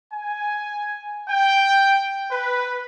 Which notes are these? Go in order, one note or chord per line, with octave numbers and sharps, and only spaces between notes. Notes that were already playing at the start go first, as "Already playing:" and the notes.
G#5
G5
B4